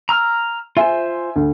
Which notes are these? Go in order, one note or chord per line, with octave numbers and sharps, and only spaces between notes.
A#5 E6 F6
F4 C5 E5 G#5
D2